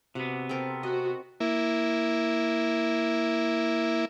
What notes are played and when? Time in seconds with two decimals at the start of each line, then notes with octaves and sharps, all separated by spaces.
0.15 C3 B3 F#4
0.49 C4 A4 A#4
0.83 F#4 D#5
1.40 A#3 E4